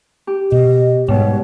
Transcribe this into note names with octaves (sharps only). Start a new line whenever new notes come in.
G4
B2 D#5
G#2 B2 G3 C#5